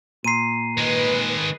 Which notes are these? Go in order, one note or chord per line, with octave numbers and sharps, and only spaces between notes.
A#2 C7 D#7
D#3 G#3 B4